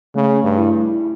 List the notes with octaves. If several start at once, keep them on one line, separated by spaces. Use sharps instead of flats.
C#3 A3
G2
E4